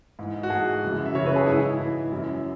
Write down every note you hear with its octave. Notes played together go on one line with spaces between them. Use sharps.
G#2 E3
F#4
G#2 E3 G#4
F#2 C#3 E3
E5
F#2 C#3 E3 C#5
B4
G#4
G#2 E3 E4
G#2 E3
F#2 E3